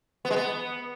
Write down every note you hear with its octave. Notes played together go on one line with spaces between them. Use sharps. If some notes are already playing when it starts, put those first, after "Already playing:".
B3
G#3
B3